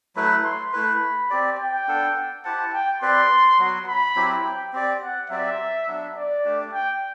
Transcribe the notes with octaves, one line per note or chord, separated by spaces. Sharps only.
F#3 A3 E4 B4 B5
C6
A3 E4 B4 B5
C4 G4 D5
G5
B3 D4 A4
E4 G4 C5 F#5 A5
G5
C4 G4 B4 D5 C6
F#3 B3 F#4
B5
F#3 C4 E4 G4
G5
C4 G4 D5
F#5
F#3 C4 G4 D5 E5
F#3 B3 D4
D5
A3 D4 G4
G5